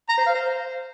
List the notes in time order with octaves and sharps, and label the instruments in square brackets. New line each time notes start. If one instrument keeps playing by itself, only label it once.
[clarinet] A#5
C5
F5
C5